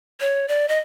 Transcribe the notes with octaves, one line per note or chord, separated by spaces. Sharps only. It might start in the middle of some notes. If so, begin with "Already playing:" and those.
C#5
D5
D#5